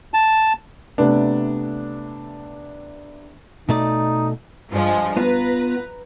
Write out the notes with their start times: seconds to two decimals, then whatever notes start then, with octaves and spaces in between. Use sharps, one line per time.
0.14 A5
0.98 C3 A3 B3 D4
3.69 B2 A3 D#4 D5
4.71 G2 F3 G#3
5.17 B3 F4 B4 A#5